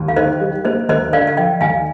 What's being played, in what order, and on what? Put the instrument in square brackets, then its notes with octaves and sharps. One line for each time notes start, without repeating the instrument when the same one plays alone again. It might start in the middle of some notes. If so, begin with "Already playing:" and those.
Already playing: [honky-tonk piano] D#2
[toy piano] F5
[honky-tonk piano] D#3 [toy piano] C5 D#5
[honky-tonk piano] G3
[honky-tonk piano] A#3 [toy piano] C5 D#5
[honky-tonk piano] D#2 [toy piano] C5 D#5
[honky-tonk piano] D3 [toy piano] D5 F5
[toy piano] F5
[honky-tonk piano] F3 [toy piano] D#5 G5
[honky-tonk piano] D#2 [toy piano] F5 G#5